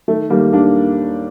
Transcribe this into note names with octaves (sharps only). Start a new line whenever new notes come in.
D#3 A3
D#2 G3 A#3
D#2 A#3 D4